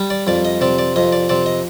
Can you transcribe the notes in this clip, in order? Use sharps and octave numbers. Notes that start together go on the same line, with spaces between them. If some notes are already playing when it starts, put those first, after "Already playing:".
Already playing: G3
D5
F2 D5
D#5
C3 D5
D5
F2 D#5
D5
C3 D5
D#5